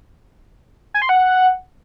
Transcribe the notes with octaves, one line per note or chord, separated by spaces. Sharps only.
G#5
C6
F#5